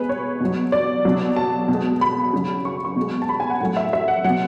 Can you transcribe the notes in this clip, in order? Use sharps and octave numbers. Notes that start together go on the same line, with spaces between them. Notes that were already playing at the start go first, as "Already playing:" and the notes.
Already playing: B2 G#3 G#4 B4
C#5
B2 F#3
D5
B2 F#3
A5
B2
G#3
B5
C#3 F#3
C#6
C#6
B2
G#3
A5
B5
G#5
F#5
A2 F#3 F#5
E5
E5
F#5
F#3 F#5
B2